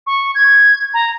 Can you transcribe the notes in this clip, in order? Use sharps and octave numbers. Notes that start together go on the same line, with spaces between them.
C#6
G#6
A#5